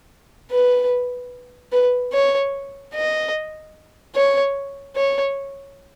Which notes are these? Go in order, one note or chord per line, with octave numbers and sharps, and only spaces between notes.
B4
B4
C#5
D#5
C#5
C#5